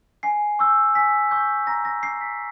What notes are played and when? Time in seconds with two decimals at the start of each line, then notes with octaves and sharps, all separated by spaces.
0.23 G#5 C7
0.59 C#6 E6 G6
0.95 G#5 B6
1.31 C#6 E6 G6
1.67 A#5 A#6
1.85 A#6
2.03 D6 G6 C7
2.21 B6